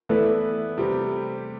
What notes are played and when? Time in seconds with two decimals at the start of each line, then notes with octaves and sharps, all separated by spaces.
0.09 E3 A3 B3 E4 B4 D5
0.78 C3 G3 C4 G4